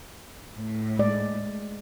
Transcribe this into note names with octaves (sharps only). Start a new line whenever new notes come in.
A2
G#3 D5